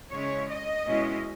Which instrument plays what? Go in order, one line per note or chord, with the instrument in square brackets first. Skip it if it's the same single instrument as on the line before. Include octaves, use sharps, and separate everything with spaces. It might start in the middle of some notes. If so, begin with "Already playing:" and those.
[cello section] C#3 G#3 C#4 E4 C#5
D#5
B2 G#3 C#4 E4